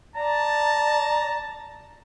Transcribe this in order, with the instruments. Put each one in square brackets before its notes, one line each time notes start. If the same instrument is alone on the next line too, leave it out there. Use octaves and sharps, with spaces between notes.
[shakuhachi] D5 [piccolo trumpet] A5 [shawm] A#5